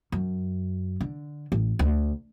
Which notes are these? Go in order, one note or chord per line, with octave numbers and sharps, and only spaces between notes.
F#2
D3
A1
D2